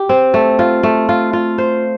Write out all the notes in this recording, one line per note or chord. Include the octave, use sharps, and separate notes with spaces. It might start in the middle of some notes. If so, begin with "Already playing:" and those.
Already playing: G4
C4
A3
F4
A3
F4
F4
C5